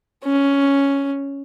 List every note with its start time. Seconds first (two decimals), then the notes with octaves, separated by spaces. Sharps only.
0.24 C#4